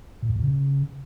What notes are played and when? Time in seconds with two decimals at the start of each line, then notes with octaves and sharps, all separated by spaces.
0.23 A#2
0.29 E2
0.36 A#2
0.43 C#3